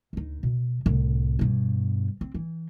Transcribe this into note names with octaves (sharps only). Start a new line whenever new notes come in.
D2 D#4
B2
C2 A2
G2 B2
C4
E3